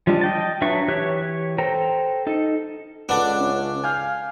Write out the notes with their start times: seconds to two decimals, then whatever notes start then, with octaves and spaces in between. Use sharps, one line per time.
0.07 F3 G3 G#3 D4
0.21 D#5 G5 A5
0.62 F#3 D4 B4 E5 C#6
0.88 E3 G4 C#5 F#6
1.58 A4 C5 G5 A#5
2.27 D#4 A4
3.09 C#2 D4 A4 B4 F#5
3.40 C#4
3.84 F5 G#5 F6 G6